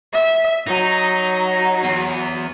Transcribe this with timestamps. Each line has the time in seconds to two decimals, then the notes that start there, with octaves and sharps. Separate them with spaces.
0.13 E5
0.67 F#3 D#4
1.83 E2